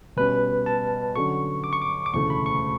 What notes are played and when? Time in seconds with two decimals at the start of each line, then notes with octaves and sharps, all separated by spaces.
0.16 B2 G3 C#4 B4
0.66 A5
1.16 D3 F#3 C#4 F#4 A4 C#6
1.64 D6
1.73 C#6
1.82 D6
2.06 D6
2.13 E1 D2 C#3 E3 A3 C#6
2.30 B5
2.46 C#6